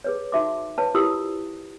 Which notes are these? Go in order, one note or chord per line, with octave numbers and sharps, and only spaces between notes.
G#4 B4 C#5
D#4 F#4 E5 C6 D6
B4 C#5 A5
E4 F4 G4 A#4 D#6 E6